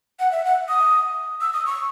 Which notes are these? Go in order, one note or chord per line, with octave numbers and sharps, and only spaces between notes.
F#5
E5
F#5
D#6
E6
D#6
C#6